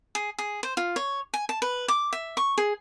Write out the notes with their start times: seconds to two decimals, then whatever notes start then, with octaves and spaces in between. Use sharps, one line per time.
0.15 G#4
0.38 G#4
0.63 C5
0.77 F4
0.96 C#5
1.34 G#5
1.49 A5
1.62 B4
1.88 D6
2.13 E5
2.37 C#6
2.58 G#4